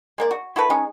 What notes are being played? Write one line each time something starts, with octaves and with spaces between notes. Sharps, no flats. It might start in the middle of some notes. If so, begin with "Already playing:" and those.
G#3 A#3 D5
F#4
E4 F#4 A4 B4
G#3 C#4 D#4